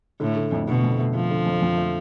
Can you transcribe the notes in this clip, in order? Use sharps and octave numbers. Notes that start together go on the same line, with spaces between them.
A2 D3
D3
F2
B2 D3
F2
A3
D3 F3
D3
F2
F2
A3